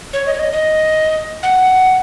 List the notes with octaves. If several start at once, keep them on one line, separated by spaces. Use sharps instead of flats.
C#5
D#5
C#5
D#5
D#5
F#5